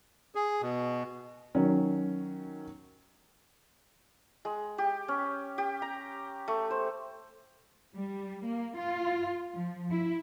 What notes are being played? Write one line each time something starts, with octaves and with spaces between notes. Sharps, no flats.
G#4
B2
D#3 F#3 C#4
G#3
G4
C#4
G4
A#5
A3
C5
G3
A#3
F4
F3
E4